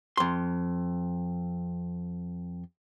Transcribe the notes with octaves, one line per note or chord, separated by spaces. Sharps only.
F2 C6